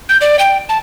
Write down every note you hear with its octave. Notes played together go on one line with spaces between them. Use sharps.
G6
D5
G5
A5